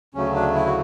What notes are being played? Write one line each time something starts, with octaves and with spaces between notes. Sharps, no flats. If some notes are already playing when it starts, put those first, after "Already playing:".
D2 C#3 F#3 A3 C#4
D4
E4
F#4